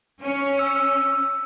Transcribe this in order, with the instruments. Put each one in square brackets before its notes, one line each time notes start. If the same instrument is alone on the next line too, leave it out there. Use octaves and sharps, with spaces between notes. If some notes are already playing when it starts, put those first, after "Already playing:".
[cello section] C#4
[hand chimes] E6